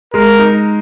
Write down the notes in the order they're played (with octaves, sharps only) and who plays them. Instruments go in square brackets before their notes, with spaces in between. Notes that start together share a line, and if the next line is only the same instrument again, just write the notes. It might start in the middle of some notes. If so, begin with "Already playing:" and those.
[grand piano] G#3 [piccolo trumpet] A#4
[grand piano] D#4